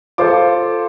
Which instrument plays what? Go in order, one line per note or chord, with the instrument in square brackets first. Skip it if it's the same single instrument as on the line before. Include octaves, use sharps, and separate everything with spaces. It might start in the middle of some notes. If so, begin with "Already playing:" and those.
[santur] F4 [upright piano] A4 C5 D6